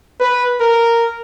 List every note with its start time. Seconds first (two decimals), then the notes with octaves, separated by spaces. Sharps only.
0.20 B4
0.60 A#4